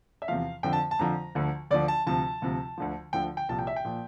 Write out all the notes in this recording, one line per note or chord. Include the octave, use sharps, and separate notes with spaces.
E5
E2 C3 F3 F5
F2 D3 F3 G5
A5
A5
F2 D3 F3 A#5
D2 D3 F3
D2 D3 F3 D5
A5
D2 C3 F3 A5
D2 C3 F3
D2 D3 F3
D2 D3 F3 G5
G5
C2 A#2 F3 A5
G5
E5
G5
A#2 F3